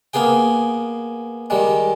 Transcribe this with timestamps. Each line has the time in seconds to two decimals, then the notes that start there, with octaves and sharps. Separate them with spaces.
0.13 A#3 B3 G#4 G5
1.50 D#3 G3 G#3